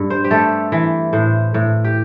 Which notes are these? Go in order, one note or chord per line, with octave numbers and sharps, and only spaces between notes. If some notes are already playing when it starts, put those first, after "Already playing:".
Already playing: G2
C5
G4
A3 A4
E3
A2 C5
A2
G4